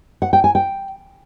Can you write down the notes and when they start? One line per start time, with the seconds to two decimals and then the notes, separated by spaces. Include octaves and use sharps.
0.22 F#5
0.33 G5
0.44 G#5
0.55 G5